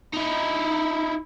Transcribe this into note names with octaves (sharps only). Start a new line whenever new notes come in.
D#4 E4